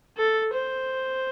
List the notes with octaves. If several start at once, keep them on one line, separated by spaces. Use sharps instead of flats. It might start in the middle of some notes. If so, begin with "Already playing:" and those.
A4
C5